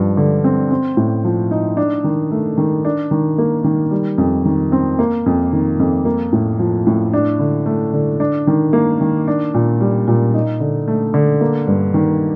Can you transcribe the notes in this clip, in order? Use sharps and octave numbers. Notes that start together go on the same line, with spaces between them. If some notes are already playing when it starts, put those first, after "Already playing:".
Already playing: G2 F3
D3
C4
C4
A2
F3
D#4
D4
D#3
A3
D#3
D4
D#3
A#3
D#3
G3
F2
D#3
C4
A#3
F2
D#3
F2
A#3
A2
F3
A2
D4
D3
A3
D3
D4
D#3
A#3
D#3
D4
A#2
G3
A#2
D#4
D3
A3
D3
A#3
G2
D#3